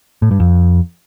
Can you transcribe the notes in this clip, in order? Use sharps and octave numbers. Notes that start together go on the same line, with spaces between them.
A2
G2
F2